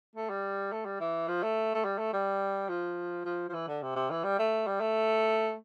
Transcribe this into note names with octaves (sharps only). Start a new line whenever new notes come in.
A3
G3
A3
G3
E3
F3
A3
A3
G3
A3
G3
F3
F3
F3
E3
D3
C3
C3
E3
G3
A3
G3
A3